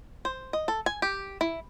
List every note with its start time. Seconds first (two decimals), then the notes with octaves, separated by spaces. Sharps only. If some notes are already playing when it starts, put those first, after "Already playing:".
0.25 C5
0.53 D#5
0.68 A4
0.86 G#5
1.02 G4
1.41 E4